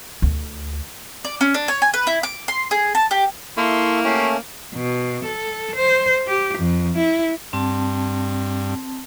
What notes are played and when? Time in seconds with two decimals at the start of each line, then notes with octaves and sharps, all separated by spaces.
0.22 D2
1.25 D5
1.41 C#4
1.54 D4
1.68 C#5
1.82 G#5
1.94 B4
2.07 E4
2.23 D6
2.48 C6
2.71 G#4
2.95 A5
3.11 G4
3.57 A#3 E4 A4 E5 C6 C#6
4.04 A3 C#4 F#4 G4 F5
4.74 B2
5.25 A4
5.75 C5
6.27 G4
6.57 F2
6.98 E4
7.53 G2 C4 A5